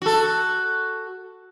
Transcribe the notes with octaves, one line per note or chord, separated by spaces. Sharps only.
F#4 A4